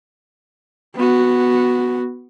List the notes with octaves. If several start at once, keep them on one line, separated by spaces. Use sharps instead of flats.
B3 F#4